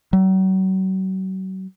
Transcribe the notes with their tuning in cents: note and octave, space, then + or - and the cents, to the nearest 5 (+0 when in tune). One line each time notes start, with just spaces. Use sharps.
F#3 +40